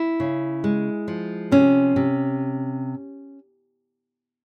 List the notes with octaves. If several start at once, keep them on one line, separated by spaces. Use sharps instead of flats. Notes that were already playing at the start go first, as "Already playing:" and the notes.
Already playing: E4
C#3
G#3
F3
C3 C#4
C3